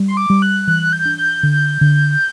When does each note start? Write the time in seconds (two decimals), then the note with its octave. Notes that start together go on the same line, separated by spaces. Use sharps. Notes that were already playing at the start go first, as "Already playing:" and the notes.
Already playing: G3
0.08 C6
0.17 D6
0.30 G3
0.42 F#6
0.67 E3 F#6
0.93 G6
1.05 D4
1.18 G6
1.43 D3
1.81 D3